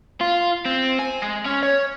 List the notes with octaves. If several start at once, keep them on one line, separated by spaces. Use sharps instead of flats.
F4
C4
G#5
G#3
C#4
C#5